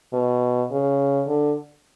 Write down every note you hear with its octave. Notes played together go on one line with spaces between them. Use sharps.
B2
C#3
D3